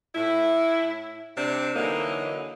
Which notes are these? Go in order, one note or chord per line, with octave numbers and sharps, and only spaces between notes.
A2 E4
C3 G3 C4 D4
D3 E3 F#3 A#3 D#4